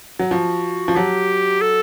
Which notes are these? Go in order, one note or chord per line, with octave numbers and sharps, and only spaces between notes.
F#3
F3 F#4
F3
F#3 G4
A4